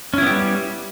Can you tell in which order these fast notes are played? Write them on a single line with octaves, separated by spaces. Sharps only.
C#4 E4 B3 G4 G3